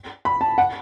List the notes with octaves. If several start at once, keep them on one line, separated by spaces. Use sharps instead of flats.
B5
A5
F#5